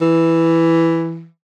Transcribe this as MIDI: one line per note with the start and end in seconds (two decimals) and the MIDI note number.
0.01 1.26 52